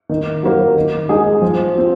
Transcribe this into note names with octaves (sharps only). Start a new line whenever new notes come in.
D#3
F#3 A#3
D#3
G#3 D#4 G#4
F3
C4 F4